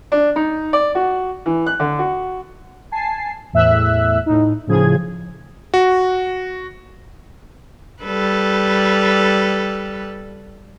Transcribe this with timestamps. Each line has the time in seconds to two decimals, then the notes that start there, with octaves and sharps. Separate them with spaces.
0.12 D4
0.36 D#4
0.73 D5
0.95 F#4
1.46 E3
1.67 F#6
1.80 D3
1.99 F#4
2.92 G#5 A5 C7
3.53 E2 A2 E5 E6 F#6
4.26 A2 D#4
4.67 A2 C#3 F3 G#4 G#6
5.74 F#4
8.03 G3 A4 B4